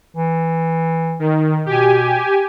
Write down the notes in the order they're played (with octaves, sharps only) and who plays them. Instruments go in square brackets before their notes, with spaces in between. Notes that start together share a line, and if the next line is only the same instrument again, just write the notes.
[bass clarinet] E3
[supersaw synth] D#3
[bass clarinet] B2 [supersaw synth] G4 G#5